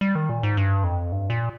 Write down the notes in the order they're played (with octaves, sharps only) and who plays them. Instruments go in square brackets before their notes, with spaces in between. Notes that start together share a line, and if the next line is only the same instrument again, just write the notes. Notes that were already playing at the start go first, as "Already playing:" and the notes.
[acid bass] G3
D#3
A#2
G#2
G2
F2
G2
A#2